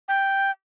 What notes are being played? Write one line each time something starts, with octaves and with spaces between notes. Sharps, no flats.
G5